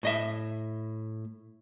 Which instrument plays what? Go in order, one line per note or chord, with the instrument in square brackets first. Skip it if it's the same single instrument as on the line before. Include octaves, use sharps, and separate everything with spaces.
[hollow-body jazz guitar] A2 D#5 E5